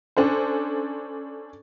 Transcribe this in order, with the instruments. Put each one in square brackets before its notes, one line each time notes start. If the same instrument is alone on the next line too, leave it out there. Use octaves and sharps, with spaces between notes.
[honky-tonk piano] C#4 D4 A4 C5